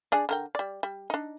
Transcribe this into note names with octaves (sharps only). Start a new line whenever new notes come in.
D4 G#4 D5
D3 A#4 G5
G3 D5
G3
D4 D#4